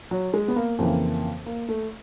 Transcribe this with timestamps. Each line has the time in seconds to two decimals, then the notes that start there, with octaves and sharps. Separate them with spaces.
0.11 F#3
0.34 G#3
0.48 B3
0.56 A#3
0.78 F2 C#3 E3 A#3
1.46 A#3
1.69 A3